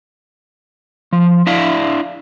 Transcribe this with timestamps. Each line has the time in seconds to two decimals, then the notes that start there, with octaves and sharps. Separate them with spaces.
1.13 F3
1.47 D4 E4 E5 F5